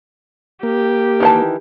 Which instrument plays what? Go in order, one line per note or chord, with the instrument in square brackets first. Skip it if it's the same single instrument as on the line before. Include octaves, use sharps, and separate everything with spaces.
[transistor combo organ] A#3 [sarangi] G4
[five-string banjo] D#3 E3 A5